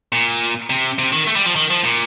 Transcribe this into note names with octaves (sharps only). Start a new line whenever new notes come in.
A#2
C3
C3
D#3
A3
G3
F3
D#3
F3
A#2